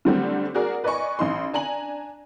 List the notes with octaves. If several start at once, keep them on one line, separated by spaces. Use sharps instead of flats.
D3 F#3 G3 A3 C4 D4
F#4 G#4 A#4 D5
B4 D5 D#5 G#5 C#6
A1 D#4 C6
D4 G#5 A#5 F#7